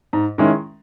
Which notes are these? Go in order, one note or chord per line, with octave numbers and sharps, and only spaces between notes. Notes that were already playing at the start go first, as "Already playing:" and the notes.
G#2
D#3 G#3 C#4 E4